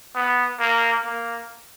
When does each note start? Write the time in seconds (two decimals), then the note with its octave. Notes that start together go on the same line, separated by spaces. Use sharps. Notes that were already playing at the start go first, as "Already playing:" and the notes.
0.15 B3
0.60 A#3
1.05 A#3